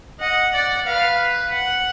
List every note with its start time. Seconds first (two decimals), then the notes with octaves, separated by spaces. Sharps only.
0.20 D#5 F#5
0.53 D5
0.86 B4 F5
1.52 F#5